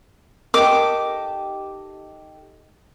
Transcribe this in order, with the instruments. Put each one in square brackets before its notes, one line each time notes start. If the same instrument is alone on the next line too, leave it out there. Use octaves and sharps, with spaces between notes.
[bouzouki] D#4 G4 A4 [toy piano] A#4 [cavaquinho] D6